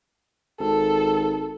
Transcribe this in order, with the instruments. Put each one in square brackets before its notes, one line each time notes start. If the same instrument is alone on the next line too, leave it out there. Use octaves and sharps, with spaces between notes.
[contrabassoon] G#1 [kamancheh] A4